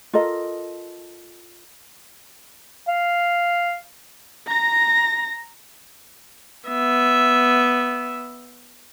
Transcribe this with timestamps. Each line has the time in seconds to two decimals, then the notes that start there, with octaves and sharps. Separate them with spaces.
0.13 F4 A4 A#4 D#5
2.88 F5
4.47 A#5 A#6
6.69 B3 E5